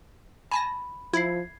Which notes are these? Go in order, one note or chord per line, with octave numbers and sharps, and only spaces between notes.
G#5 A5 B5 A#6
F3 E4 G#6 C7